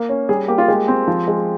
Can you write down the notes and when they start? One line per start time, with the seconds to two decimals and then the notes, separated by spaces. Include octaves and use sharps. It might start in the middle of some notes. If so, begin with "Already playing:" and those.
Already playing: A#3
0.09 C#4
0.29 G3 G#4
0.48 A#3 G4
0.58 F4
0.68 G#3 G4
0.88 C4
1.08 F3
1.28 G#3